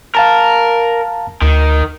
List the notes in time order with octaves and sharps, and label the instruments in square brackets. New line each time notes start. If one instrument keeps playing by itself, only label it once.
[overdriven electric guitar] A#4 [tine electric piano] F5 A5 A#5
[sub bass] D2 [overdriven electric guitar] D#3